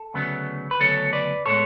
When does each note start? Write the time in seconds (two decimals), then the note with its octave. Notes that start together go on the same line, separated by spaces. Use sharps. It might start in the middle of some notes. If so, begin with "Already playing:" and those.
Already playing: A4
0.14 D2 C#3 F#3 B3
0.71 B4
0.80 D2 C#3 F#3 B3 A4 C#5
1.13 B4 D5
1.46 A2 G#3 B3 A4 C#5